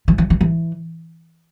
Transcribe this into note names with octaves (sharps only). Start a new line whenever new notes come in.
E3
E3
E3
E3